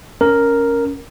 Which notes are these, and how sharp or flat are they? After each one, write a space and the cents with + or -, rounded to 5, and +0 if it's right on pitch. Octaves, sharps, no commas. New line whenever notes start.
C#4 +0 A#4 +0